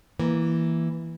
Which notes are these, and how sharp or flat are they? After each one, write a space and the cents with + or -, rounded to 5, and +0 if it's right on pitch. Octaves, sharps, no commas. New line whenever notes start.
E3 +0 A#3 +5